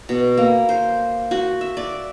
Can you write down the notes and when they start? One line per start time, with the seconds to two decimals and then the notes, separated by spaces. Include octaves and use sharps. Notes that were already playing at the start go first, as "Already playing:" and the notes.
0.09 B2
0.38 A#3
0.69 C5
1.31 F#4
1.61 E5
1.77 D5